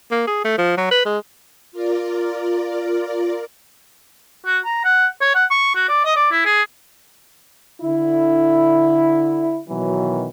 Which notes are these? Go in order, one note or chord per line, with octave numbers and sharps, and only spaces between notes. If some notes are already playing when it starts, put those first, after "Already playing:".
A#3
G#4
A3
F3
F#3
B4
G#3
F4 A#4 D5
F#4
A#5
F#5
C#5
F#5
C#6
F#4
D5
D#5
D5
E4
G#4
D3 E4
B2 D#3 E3 F#3